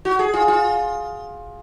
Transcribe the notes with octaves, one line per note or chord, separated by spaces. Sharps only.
F#4
G#4
F4
F4